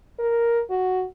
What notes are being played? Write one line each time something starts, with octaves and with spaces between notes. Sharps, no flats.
A#4
F#4